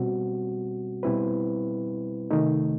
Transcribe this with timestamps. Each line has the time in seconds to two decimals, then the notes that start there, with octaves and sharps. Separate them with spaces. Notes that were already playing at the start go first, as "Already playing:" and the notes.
Already playing: B2 G3 C4 F#4
1.03 B2 G3 C4 E4 B4
2.31 C3 D#3 A3 D#4